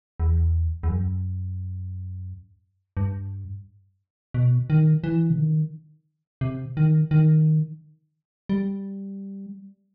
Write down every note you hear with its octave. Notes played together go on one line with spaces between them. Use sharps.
E2
E2
F#2
G2
B2
D#3
E3
C3
D#3
C3
D#3
D#3
G3